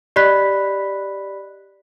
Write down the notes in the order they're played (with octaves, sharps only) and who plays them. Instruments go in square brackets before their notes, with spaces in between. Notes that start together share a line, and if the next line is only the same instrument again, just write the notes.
[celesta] G4 D5 D#5 B5 F#6 B6